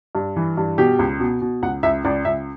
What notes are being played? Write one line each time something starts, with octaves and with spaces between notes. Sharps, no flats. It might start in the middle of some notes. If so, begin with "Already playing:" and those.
G2
E3
G2
B2 G4
C#2
B2
B2
C#2 F#5
C#2 E5
C#2 D5
C#2 E5